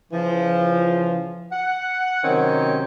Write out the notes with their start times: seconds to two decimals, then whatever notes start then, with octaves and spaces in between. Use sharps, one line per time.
0.12 C#3 E3 F3
1.52 F#5
2.24 C3 D#3 F#3 C4 C#4